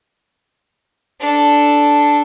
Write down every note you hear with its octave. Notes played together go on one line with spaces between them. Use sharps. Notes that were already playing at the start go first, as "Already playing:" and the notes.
D4 A4